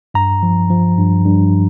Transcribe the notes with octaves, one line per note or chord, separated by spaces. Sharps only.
G2 A#5
F3
F3
G2
G2